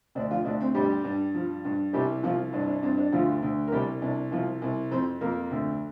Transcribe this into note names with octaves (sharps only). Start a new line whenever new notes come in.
D2 D4
F3 F4
D2 D4
C4
G2 G3 G4
G2
F3
G2
C2 G3 G4
C2 F3 F4
G2 D4
D4
G2 C4
D4
D2 F3 F4
D2
A#4
C2 G3 G4
C2 D4
C2 F3 F4
C2
F2 C4 C5
F2 A#3 A#4
D2